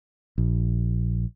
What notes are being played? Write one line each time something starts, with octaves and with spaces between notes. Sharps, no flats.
A#1